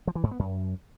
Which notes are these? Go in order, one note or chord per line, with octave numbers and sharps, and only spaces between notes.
F3
E3
G#2
B3
F#2